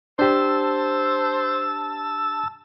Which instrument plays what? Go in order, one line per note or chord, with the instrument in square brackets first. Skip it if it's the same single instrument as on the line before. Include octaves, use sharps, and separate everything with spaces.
[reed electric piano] D4 G4 [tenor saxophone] C5 [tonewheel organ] A5 E6